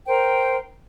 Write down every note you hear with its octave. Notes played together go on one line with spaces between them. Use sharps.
A#4 C5 G5